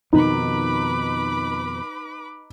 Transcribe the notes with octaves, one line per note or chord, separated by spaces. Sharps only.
F2 B2 D#3 D#4 B4 B5 D6